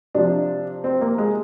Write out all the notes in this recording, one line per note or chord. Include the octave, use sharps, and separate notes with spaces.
C3 F3 D4
C4
A#3
G#3